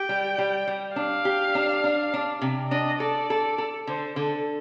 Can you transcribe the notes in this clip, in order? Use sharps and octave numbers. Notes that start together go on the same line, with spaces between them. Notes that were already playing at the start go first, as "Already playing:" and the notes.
Already playing: G4 G5
G3
G3
G3
D4 F5
G4
D4
D4
D4
C3
D4 D#5
A4 D5
A4
A4
D3 C5
D3 A4